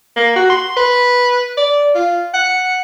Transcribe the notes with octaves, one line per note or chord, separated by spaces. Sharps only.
A#3
F#4
C6
B4
D5
F4
F#5